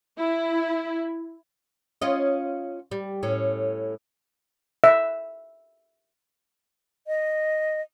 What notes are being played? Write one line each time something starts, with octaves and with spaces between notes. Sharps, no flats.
E4
C#4 F4 D#5
G3
A2 C#4
E5
D#5